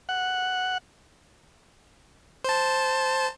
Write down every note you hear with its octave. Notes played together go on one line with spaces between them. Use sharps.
F#5
C5 A5